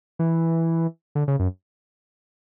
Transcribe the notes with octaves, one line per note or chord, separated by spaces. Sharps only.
E3
D3
C#3
F#2